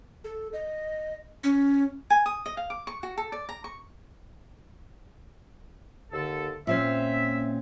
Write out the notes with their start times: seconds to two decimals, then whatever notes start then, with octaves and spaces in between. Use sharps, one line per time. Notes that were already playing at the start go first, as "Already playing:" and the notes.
0.24 A4
0.53 D#5
1.44 C#4
2.10 G#5
2.26 D#6
2.46 D#5
2.57 F5
2.70 D6
2.87 C#6
3.03 F#4
3.18 A4
3.32 D5
3.49 A#5
3.64 C#6
6.11 D#2 D3 A4
6.67 A#2 C4 C#4 E5